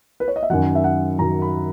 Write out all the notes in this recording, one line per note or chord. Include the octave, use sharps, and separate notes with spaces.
B4
C#5
D#5
E5
F#2 D#3 F#3 F#5
E5
F#5
F#2 D#3 F#3 A#5
B5